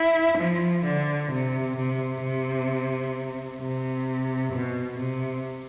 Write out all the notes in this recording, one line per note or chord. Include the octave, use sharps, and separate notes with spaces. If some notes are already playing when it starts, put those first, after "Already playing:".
Already playing: E4
F3
D3
C3
C3
C3
C3
B2
C3